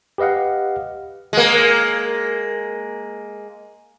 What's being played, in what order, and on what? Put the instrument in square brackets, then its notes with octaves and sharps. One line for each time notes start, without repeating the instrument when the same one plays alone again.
[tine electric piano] G4 B4 D#5 F5 F#5
[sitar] G#3 A#3